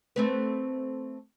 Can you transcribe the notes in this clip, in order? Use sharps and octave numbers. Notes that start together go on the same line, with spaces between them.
A3 C4 B4